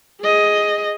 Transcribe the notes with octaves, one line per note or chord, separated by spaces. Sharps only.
G#4 D#5